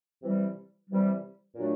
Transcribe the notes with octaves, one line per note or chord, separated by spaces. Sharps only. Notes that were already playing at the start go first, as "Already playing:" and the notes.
C3 E3 G3
C3 E3 G3
A#2 F#3 A3 D4